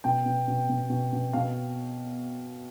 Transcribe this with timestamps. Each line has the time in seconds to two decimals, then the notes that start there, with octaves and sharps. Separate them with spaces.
0.04 B2 G5
0.26 B2
0.48 B2
0.69 B2
0.90 B2
1.13 B2
1.33 B2 F5